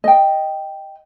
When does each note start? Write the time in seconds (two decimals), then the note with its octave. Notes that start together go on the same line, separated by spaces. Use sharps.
0.04 D#5 G5